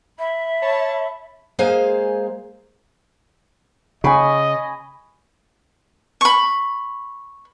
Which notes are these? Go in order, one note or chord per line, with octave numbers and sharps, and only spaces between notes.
E5 B5
C#5 A5
G#3 A#3 G#4 C5 F5 G#5
C#3 D#5 G#5 B5 C#6
B5 C#6